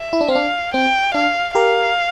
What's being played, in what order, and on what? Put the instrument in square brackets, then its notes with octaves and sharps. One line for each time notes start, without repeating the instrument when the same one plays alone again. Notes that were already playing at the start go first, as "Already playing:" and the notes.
Already playing: [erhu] E5
[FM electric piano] E4
D4
C4
[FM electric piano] D4 [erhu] F5
[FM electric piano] C4 [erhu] G5
[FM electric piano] D4 [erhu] F5
[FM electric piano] G4 A#4 [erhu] F5